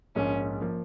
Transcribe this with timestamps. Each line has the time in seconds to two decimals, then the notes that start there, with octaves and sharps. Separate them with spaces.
0.15 A#1 G#2 F3 A#3 C#4
0.61 F3 A#3